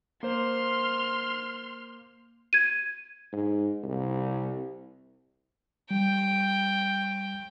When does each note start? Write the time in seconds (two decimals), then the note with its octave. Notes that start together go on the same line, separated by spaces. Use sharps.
0.23 A#3 C5 C6 F6
2.53 G#6 D#7
3.33 G#2
3.84 C2
5.91 G3 G5